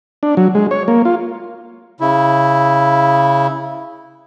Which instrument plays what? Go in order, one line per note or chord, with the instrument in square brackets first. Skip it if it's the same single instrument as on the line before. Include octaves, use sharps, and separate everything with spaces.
[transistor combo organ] D4
F#3
G#3
C#5
A#3
F4
[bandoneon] C#3 E4